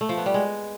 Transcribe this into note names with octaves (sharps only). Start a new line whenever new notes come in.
A3
F3
B3
G3
G#3